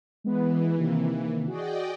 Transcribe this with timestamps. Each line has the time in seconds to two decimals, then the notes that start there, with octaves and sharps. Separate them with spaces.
0.24 E3 G#3 B3 B4
0.78 C3 D#3 A#3
1.48 F#4 G#4 D5 D#5 G5